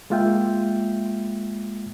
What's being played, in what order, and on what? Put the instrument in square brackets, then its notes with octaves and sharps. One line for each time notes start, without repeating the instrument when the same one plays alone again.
[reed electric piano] G#3 A#3 F4 E5 G5